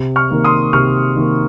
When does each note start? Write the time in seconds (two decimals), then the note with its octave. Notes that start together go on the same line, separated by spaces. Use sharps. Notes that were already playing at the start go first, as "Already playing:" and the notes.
Already playing: C3
0.16 C#6 F6
0.30 D#3 A#3
0.44 C6 D#6
0.73 C3 C#6 F6
1.16 D#3 A#3